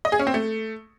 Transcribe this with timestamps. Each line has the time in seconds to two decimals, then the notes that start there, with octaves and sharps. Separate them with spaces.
0.05 D#5
0.12 G#4
0.19 C#4
0.27 C4
0.34 A3